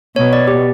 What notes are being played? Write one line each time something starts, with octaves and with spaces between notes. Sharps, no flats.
B2 C#5
D5
G4